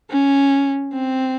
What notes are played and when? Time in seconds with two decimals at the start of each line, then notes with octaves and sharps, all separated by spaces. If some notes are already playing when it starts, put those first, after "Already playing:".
0.11 C#4
0.93 C4